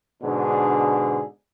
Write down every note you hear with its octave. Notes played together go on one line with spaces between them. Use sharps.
G#2 B2 D3 D4 G#4